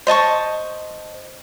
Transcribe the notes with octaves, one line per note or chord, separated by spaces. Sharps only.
C5 D#5 A5 C#6